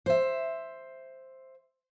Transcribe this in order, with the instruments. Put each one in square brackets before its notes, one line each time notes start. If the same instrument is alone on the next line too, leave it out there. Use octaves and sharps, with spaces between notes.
[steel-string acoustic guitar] C5 E5